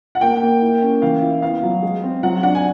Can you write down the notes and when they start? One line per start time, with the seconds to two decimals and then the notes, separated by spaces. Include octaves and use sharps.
0.15 F#5
0.21 A#3 G5
0.42 A#3
0.62 E4
0.81 C#4
1.02 E3 F5
1.22 E4
1.42 B3 F5
1.63 F#3
1.82 G#3
2.03 C4
2.23 F#3 F#5
2.43 D4 F#5
2.55 G#5